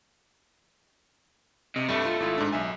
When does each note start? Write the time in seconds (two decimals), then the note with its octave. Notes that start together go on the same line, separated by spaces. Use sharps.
1.76 C3 D#5
1.89 G2 G3 A3
2.05 F4
2.20 G#1 E4 F4
2.38 G#2 D4
2.52 B1 E5 G#5